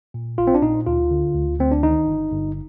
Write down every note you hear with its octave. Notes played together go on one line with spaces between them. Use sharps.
A#2
A#1 F4
C4
D4
A#2 D#4
D2 F4
D3
D2
D2 C4
D4
D#3 D#4
G1
G1